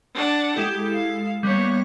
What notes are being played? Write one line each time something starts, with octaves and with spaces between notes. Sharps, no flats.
D4 F#5
G#3 E4 G4 A4
F5
G3 A#3 B3 C#5